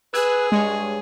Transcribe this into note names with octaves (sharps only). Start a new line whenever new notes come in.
G#4 B4 E6 F#6 G#6
G2 G#3 C#5